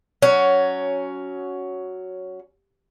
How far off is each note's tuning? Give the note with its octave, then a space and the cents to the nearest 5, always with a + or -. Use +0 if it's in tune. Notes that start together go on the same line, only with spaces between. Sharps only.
F#3 +0 C#4 +10